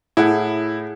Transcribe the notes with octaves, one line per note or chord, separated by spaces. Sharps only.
A2 E4 G#4 F#5